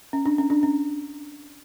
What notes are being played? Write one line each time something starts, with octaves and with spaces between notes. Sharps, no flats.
C#4
D4
C#4
D4
C#4